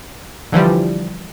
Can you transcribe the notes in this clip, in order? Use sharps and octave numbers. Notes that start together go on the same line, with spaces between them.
D3 E3 F3 G3